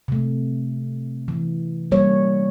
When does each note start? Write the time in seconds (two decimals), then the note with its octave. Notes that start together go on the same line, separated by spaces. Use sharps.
0.08 C3 A3
1.28 E3
1.92 G3 A#3 C#5